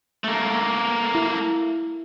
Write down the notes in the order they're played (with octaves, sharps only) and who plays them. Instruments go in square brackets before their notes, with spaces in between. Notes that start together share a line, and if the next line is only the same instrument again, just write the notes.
[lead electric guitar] A3 A#3
[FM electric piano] E4